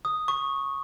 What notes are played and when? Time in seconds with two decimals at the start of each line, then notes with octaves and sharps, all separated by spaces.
0.05 D#6
0.28 C#6